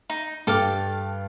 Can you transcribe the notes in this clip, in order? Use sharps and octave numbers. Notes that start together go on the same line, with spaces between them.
D#4
G2 A4 G5 D6 F6